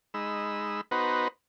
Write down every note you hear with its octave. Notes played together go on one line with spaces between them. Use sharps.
G#3 D#4 B5 E6
B3 D#4 F#4 B4 C5 A#5